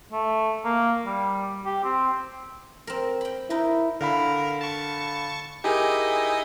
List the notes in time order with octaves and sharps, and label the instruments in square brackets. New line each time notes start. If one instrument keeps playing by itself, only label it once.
[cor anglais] A3
A#3
G3
G4
C4
[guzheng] C4 A#4
G5 B5
[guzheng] D#4 A#4 B4 [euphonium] E4
[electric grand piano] D3 F5 B5 [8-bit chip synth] A#4
[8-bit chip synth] A5 C#6
[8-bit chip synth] D#4 E4 D#5 [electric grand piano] G4 G#4 A#4 [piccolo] G#5